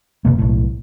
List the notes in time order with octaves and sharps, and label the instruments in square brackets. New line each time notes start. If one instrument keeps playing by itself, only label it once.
[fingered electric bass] F#1 B2 A#3
B1 A2